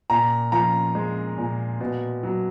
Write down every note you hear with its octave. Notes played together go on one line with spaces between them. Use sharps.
A#2 A#5
F3 A#5
G#3
A#2
B2
F#3